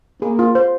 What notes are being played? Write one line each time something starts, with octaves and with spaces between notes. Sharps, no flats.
A#3 G#4
F4
C5